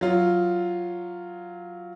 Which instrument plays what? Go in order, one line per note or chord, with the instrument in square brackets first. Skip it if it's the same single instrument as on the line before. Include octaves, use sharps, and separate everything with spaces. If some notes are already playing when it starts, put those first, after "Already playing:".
[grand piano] F#3 F4